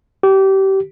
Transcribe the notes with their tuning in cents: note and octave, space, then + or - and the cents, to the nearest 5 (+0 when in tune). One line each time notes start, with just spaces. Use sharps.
G4 -25